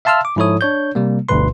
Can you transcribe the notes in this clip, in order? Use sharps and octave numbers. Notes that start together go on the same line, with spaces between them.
E5 F5 A5 C6 E6 F6
D6
G#2 F3 E4 A4 C#5 D#6
D4 C#5 G6
C3 G3 A#3
G1 D2 G2 B2 B4 C6